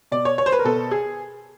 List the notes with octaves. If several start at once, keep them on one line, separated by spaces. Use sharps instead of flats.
B2 D5
C#5
C#5
C5
B4
A#4
B2 A4
G#4